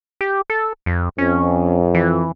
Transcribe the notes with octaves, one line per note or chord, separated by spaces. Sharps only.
G4
A4
F2
F2 C#4
E3